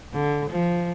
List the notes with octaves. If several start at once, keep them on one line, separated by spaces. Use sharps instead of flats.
D3
F3